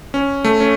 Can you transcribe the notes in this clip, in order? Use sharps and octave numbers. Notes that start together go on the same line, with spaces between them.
C#4
A3
C#4